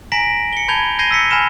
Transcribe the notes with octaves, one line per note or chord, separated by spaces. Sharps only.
G#5 A#5 A#6 B6 D7 F#7
C#7 G7
A5 B5 G6 G#6 F7 G7
G6 G#6 A#6 C7 D#7 G7
E6 B6 C#7
G#5 B5 F6 E7 G7